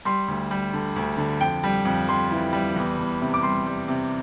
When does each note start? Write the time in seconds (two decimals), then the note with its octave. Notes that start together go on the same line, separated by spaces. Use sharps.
0.05 G3 C6
0.28 D2
0.51 G3
0.74 D3
0.96 D2
1.17 D3
1.40 F2 G5
1.64 G3
1.85 F2
2.09 F2 C6
2.31 E3
2.53 G3
2.76 E2
2.99 E2
3.21 C3
3.34 D6
3.43 G3 C6
3.67 G3
3.88 C3